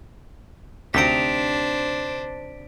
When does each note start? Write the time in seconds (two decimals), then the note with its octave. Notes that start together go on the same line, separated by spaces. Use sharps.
0.94 D2 C3 D4 D#4 C5 A#5 B6 D7